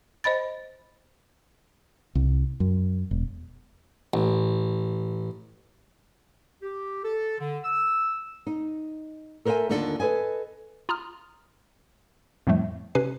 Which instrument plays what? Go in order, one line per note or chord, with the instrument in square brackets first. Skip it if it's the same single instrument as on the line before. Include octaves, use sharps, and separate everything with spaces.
[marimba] C5 D#5 B5 A6
[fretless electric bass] C2
F#2
E1
[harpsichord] A1
[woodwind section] G4
A4
D3
E6
[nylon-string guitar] D#4
A4 A#4 C5 D#5 E5 G#5
D#2 D3 D#3 D4 F4 A4
A4 B4 D#5 G#5
[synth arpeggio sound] F4 A#5 D#6 F6
F2 A2 F3 G3 A3
C3 C#4 B4 G#5 C7